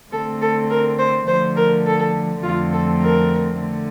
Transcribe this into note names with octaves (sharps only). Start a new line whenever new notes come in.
D3 A3 C4 A4
A4
A#4
C5
D3 F3 A3 C5
A#4
A4
F2 D3 F3 A3 C4 F4
A4
A#4
D3 A3